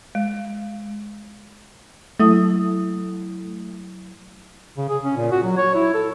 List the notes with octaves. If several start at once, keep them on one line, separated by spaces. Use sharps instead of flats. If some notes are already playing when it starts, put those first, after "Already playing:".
G#3
F#3 A3 E4 D#6
C#3
G#4
C#4
A#2
F#4
F#3
C#5
E4
A4